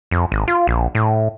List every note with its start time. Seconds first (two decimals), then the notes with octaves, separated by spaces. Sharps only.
0.11 F2
0.32 G#1
0.48 F4
0.67 A#1
0.95 A2